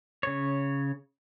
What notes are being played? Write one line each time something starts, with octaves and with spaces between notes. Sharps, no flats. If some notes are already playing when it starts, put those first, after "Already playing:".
C#3 C#5